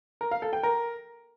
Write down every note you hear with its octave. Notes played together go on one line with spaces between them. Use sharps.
A#4
F5
A4
G5
A#4